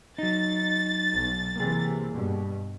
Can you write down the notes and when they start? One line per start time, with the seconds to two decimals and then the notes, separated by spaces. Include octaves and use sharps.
0.18 F#3 D#4 A6
1.12 B1
1.56 C3 E3 A#3 G#4
2.13 G2 B2